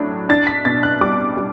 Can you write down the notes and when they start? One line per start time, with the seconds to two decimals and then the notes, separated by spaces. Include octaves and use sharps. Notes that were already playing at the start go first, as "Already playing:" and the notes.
Already playing: A2 F#3 D4
0.29 D4 A6
0.47 B6
0.65 B2 A6
0.83 F#6
1.01 G3 D6
1.37 G3